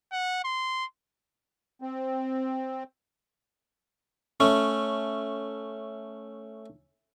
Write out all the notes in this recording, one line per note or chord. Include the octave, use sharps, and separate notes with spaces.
F#5
C6
C4
A3 C#4